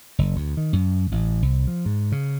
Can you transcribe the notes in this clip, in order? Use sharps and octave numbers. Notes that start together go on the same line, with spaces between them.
F#1
D2
D#3
F#2
A1
C2
F3
G#2
C#3